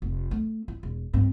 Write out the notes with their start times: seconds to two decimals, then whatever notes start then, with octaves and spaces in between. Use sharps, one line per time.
0.02 F1
0.31 A3
0.68 E4
0.83 E1
1.13 G2 C4